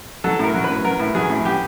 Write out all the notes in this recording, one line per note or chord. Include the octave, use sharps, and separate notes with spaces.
F#3 A4
A2 A#4
F#3
B4
A2
F#3 A#4
A2
F#3 G#4
A2
F#3 G4